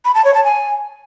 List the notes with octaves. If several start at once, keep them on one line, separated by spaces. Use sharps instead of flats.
B5
A5
C#5
A5
G#5